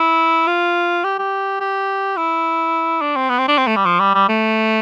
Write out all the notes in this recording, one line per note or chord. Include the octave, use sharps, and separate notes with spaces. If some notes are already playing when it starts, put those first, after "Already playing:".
Already playing: E4
F4
G4
G4
G4
E4
D4
C4
B3
C4
D4
C4
A3
G3
F3
G3
G3
A3